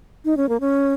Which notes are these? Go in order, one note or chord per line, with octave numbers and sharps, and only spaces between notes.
D#4
C#4
A#3
C#4